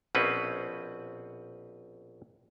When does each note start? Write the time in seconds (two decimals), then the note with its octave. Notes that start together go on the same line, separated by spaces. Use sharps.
0.15 A#1 B2 C4 C#4 B4